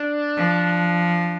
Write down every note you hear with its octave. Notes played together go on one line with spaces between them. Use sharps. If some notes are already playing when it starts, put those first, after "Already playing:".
Already playing: D4
F3